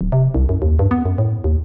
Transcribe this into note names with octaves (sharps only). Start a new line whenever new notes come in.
D1
C3
C2
F#2
D#2
G2
B3
F#2
A2
D#2